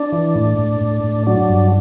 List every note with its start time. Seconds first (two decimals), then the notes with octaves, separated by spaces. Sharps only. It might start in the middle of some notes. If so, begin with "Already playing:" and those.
Already playing: D4
0.12 E3
0.35 A2
0.59 A2
0.81 A2
1.04 A2
1.27 F#3 D4
1.49 G2